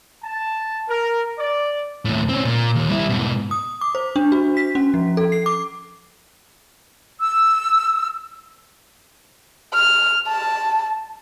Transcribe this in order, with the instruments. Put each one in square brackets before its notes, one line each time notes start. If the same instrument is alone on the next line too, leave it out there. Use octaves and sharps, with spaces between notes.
[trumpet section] A5
A#4
D5
[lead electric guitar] D#2 A2
C4 C#4
A#2
D#2
G3 E4
G#2 B2
[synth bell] D#6
D6
C5
D4
F#4
B6
C#4
F3
A4
C7
D6
[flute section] E6
[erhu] F6
A5